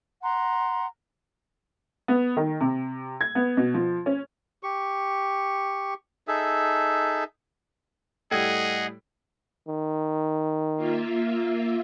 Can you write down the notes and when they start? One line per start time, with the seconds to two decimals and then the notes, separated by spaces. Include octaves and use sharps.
0.22 F#5 A#5 C6
2.08 B3
2.37 D#3
2.60 C3
3.21 G#6
3.35 B3
3.57 B2
3.74 F3
4.06 C#4
4.63 G4 C#6
6.28 D#4 G#4 A4 E5
8.31 A2 G3 G#4 A4 D#5 F#5 G5 G#6
9.68 D#3
10.76 A#3 F4 E5